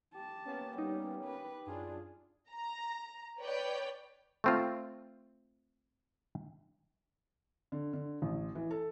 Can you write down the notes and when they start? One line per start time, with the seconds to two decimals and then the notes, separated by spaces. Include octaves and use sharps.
0.15 G4 A5
0.45 A#3 B3 C#4
0.78 G3 D#4
1.25 B4
1.66 F#2 D4 F4 G#4
2.51 A#5
3.40 B4 C#5 D5 G5
4.44 A3 C4 F4
7.72 D3
7.93 D3
8.22 A1
8.55 E3
8.71 A4